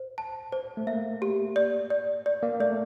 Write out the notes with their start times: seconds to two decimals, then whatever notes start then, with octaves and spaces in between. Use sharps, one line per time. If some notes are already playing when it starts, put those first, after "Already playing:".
Already playing: C5
0.18 A5
0.52 C5
0.77 A3
0.87 A#3 E5
1.22 G4
1.56 D5
1.90 D5
2.26 D5
2.43 A#3
2.60 A3 D5